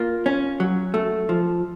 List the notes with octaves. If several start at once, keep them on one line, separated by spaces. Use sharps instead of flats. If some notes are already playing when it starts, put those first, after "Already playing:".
Already playing: A#3 F4
C#4
F#3
A3
F3